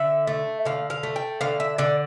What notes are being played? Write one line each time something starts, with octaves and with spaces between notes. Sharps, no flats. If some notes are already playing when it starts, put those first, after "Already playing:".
Already playing: D3 E5
A3
D3 F5
F5
A3
G5
D3 F5
E5
D3 D5